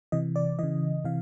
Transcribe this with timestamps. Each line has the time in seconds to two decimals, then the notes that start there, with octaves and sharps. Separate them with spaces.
0.12 C3 E3 D#5
0.36 D5
0.59 C#3 E3 D#5
1.05 C3 E3 F5